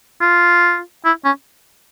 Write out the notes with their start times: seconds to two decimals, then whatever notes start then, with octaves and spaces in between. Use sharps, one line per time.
0.21 F4
1.05 E4
1.24 C#4